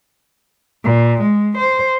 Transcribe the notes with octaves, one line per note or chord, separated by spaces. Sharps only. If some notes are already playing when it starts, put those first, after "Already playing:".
A#2
G#3
C5